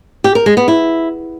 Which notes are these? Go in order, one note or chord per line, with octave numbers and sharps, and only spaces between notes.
G4
A#4
G#3
B3
E4